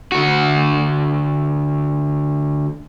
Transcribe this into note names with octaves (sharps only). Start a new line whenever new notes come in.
D2 F#4